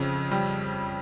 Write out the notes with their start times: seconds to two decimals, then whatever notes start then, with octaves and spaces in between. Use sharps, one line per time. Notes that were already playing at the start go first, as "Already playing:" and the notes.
Already playing: F2 C#3
0.31 G3